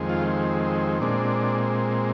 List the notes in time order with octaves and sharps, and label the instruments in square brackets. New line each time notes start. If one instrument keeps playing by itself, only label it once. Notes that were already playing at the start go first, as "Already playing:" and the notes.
Already playing: [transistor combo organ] F2 D#3 G#3 C4
F4
A#2 G#3 C4 D4